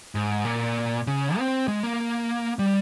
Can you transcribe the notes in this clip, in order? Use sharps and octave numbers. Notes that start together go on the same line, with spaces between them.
G#2
A#2
C#3
C4
G#3
A#3
G3